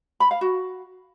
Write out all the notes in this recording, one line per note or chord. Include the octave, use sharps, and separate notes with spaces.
B5
F5
F#4